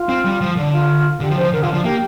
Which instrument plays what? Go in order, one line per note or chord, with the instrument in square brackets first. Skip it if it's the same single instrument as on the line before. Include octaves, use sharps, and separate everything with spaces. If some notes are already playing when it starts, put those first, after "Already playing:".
Already playing: [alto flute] F4
[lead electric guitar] C4
G3
F3
[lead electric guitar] D3 [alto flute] D4
[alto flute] F4
[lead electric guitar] D3 [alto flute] G4
[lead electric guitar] F3
[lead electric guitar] D3 [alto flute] C5
[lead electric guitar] F3
[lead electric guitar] D3 [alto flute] A#4
[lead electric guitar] D3 [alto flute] F4
[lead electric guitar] F3 [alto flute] D4
[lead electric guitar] A#3 [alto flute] G4